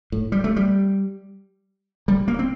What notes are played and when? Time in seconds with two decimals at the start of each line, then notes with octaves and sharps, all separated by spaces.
0.12 A2
0.32 G3
0.44 A3
0.56 G3
2.08 G3
2.28 A#3
2.39 C4